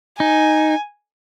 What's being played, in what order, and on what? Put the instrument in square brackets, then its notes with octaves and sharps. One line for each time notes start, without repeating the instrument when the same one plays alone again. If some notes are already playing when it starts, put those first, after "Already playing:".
[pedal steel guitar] D#4 [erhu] G#5